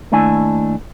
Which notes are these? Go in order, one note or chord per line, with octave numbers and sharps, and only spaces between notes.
D#2 A3 D4 E4 G#5